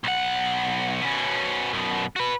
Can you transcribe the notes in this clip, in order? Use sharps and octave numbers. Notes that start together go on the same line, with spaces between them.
B1 F#5
B2 C#4
F#2 B2
F#4 B4